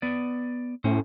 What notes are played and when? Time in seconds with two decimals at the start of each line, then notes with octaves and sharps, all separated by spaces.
0.02 B3 D5
0.84 A2 C#4 C5